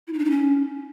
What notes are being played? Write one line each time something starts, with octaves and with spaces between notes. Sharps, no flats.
E4
D#4
D4
D#4
C#4